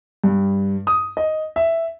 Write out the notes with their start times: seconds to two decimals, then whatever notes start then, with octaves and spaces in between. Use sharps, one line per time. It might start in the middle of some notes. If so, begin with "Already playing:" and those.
0.24 G2
0.87 D#6
1.17 D#5
1.56 E5